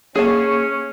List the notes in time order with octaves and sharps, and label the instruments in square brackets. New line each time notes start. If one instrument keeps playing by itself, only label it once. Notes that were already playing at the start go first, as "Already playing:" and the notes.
[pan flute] A#3 [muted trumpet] C#4 [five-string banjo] G#4 A5 [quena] C#5